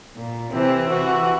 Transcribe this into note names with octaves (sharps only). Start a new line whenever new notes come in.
A#2
C3 E3 C4
C3 E3 F#4